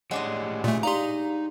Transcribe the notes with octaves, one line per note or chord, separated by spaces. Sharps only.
A2 G#3 D4 G4 C#5 D#5 F#5
A#2 A3
D#4 G4 D5 F5 A#5 C6